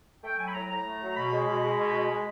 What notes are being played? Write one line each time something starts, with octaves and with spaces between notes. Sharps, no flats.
A3 G5
F#3 G#5
B5
A2 A#5
A2 A#5
A3
F#3
B2 B5
G#3
B2
G#3
B2
G#3
G#3